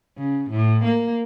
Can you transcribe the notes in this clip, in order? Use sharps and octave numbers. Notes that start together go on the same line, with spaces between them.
C#3
A2
A#3